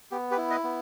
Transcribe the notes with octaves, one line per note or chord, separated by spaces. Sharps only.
B3 G4
G4 B4
E4
B4 D#5
B3